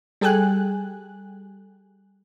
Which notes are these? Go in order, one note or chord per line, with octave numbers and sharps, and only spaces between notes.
G3 G#4 A4 G5 G#5 F#6